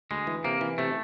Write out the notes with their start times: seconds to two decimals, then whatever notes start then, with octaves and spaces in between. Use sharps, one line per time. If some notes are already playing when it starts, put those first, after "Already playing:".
0.11 D2 G#3
0.27 E3
0.44 C3 A#3
0.61 E3
0.78 C3 A3